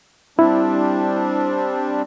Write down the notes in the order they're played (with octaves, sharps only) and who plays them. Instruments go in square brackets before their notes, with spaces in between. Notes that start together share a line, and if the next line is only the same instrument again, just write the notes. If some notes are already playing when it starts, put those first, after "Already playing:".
[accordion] G3 C4 D4 [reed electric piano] E4